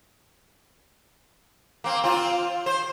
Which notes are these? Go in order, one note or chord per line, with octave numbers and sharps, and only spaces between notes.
A#3 C4
C4 F4
C5